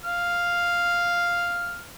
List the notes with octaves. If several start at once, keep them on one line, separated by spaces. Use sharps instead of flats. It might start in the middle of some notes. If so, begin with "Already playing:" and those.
F5 F6